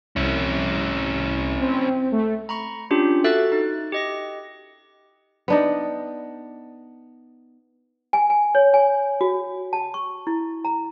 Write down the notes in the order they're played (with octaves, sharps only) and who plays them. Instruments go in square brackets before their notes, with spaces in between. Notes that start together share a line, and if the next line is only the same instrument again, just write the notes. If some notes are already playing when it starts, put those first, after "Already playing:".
[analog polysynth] C2 [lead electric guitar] C#4 E4
[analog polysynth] C4
A3
[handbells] A#5 B5 C#6
C#4 D4 F4 G4
F#4 A4 E5 C#6 F#6 A6
D#4
G4 D#5 A#6
[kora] B3 D4 D#4
[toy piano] G#5
G#5
C#5
G#5
F#4
A5
C#6
E4
A#5